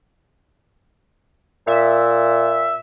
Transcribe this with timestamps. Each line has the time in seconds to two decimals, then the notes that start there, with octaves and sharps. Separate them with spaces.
1.67 A#2 E5